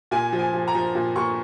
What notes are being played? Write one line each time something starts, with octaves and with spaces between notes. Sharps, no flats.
A#2 G#5
F3
G#5
F3
A#5
F3
A#2
A#2 C#6